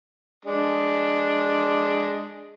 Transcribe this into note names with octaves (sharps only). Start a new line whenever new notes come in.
G#3 D4